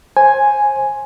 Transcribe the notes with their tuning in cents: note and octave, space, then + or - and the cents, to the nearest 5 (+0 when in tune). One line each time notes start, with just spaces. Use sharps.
C5 +25 G#5 +0